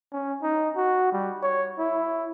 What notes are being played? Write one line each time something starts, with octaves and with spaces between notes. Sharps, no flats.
C#4
D#4
F#4
G3
C#5
E4